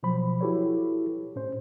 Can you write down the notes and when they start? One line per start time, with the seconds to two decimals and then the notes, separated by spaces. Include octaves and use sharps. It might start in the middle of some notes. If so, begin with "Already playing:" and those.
0.03 B2 F3 F#3 C5 B5
0.41 E4 F#4 G4 A4 B4 C#5
1.36 A2 C#4 C5